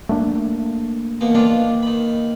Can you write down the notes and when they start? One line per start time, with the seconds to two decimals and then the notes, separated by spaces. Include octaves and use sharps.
0.09 A3 A#3 D4
1.21 E2 B2 A#3
1.35 D#3 A#3 D4 F4
1.82 D#3 B5